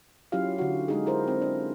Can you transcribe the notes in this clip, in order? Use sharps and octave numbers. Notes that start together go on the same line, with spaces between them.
F#3 C#4 E4 F4 G4 F5
D3 F#4
G#3 D#4 G#4
E4 A#4 C5
C4
D4